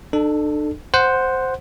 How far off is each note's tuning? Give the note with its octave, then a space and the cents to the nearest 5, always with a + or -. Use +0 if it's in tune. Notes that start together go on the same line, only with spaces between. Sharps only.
D4 +40 A4 +0
C5 +0 F#5 +0